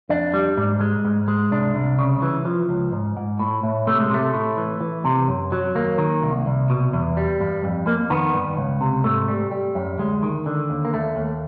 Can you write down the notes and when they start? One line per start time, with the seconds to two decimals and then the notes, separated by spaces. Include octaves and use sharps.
0.09 F2 D4
0.34 G3
0.57 G#2
0.81 G#3
1.05 G#2
1.28 G#3
1.51 C2 D4
1.75 C2
1.99 C#3
2.22 E3
2.45 F3
2.69 C#2
2.92 G#2
3.17 G#2
3.39 A2
3.63 A2
3.86 C3 A3
4.00 G#3
4.10 C3 A3
4.34 A2
4.57 E3
4.81 E3
5.05 C3
5.28 F#2
5.52 F#3
5.75 D#2 A#3
5.98 D#3
6.22 C2
6.46 C2
6.70 B2
6.93 E2
7.17 G3
7.40 G2
7.64 F2
7.87 F2 A#3
8.10 D#3 B3
8.34 G2
8.57 C#2
8.81 C3
9.04 G#2 A3
9.28 G3
9.51 G3
9.75 F#2
9.98 D2 G#3
10.23 D#3
10.46 D3
10.70 D#2
10.85 A#3
10.93 D#2 A3
11.16 D#2